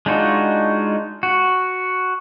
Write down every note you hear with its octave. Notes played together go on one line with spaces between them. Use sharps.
G#3 D4 D#4 F4 F#4
F#4